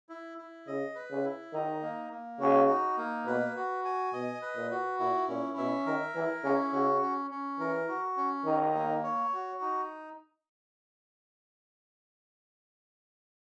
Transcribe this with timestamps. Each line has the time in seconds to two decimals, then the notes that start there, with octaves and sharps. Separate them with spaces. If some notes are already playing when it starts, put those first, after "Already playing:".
0.09 E4
0.38 E4
0.67 C#3 D#5
0.95 B4
1.11 C#3
1.25 E4
1.53 D#3 D#4
1.83 A#3
2.11 A#3
2.40 C#3 F#4
2.69 D#4
2.98 A#3
3.26 B2 B4
3.56 F#4
3.85 G#5
4.13 B2 D#5
4.42 B4
4.57 A#2
4.71 F#4
5.00 A#2 E4
5.28 A#2 C#4
5.57 B2 E5
5.86 D#3 A#4
6.15 E3 E4
6.44 C#3 C#4
6.72 C#3 F#4
7.02 C#4
7.31 C#4
7.60 E3 A#4
7.88 F#4
8.17 C#4
8.45 D#3 D#4
8.75 A#3
9.04 C#5
9.33 F#4
9.61 D#4